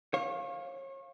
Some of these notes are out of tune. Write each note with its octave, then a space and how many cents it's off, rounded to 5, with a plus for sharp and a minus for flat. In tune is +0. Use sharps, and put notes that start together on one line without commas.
C#5 -35 F5 +10